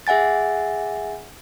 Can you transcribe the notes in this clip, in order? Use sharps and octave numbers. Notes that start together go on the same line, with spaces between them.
G#4 E5 F#5 G#5 A6